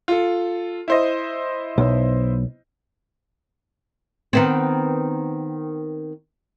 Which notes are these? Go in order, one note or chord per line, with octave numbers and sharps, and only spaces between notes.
F4 A4
E4 C5 D#5
B1
D#3 B3 C4